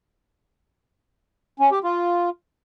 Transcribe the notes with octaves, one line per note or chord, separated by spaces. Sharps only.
C#4
G4
F4